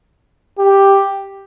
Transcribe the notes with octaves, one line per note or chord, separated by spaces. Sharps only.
G4